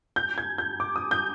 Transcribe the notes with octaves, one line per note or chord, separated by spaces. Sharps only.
G6
G#6
G6
D6
D#6
G6